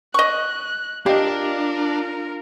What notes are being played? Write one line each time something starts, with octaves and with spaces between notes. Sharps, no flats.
D#5 C#6 F#6
D4 F4 G4 A#4 D#5 F5